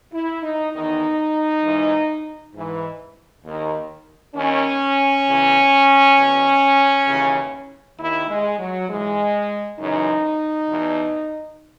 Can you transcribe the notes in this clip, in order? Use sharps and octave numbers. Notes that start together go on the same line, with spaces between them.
E4
D#4
E2 D#3 D#4
G#2 E3
G#2 E3
D#2 D#3
D#2 D#3 C#4
E2 C#3 E3
E2 B2
D#2 C#3 E3
D#2 D#3 E4
G#3
F#3
G#2 E3 G#3
F#2 C#3 E3 D#4
E2 B2